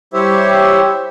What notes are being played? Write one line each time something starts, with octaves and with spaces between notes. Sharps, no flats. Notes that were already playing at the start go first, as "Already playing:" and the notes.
G3 E4 G4 C5 C#5 E5